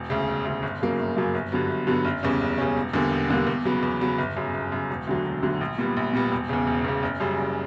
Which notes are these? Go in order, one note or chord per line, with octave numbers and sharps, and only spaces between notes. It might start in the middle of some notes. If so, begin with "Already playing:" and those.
Already playing: E1
D2 C#3
E1
D2 C#3
G1
F#2 C#3 F#3 A#3
G1
F#2 C#3 F#3 A#3
G1
G2 D3 F#3 B3
G1
G2 D3 F#3 B3
F#1
E2 C#3 G3 C#4
F#1
E2 C#3 G3 C#4
E1
E2 D3 G3 A#3
E1
E2 D3 G3 A#3
E2
C#3 F#3 B3
E2
C#3 F#3 B3
G1
F#2 C#3
G1
F#2 C#3
E1
D2 D3 F#3
E1
D2 D3 F#3
A#1
A#2 G3 B3
A#1
A#2 G3 B3
E1
E2 C#3
E1
E2 C#3
F#1
F#2 C#3 G3
F#1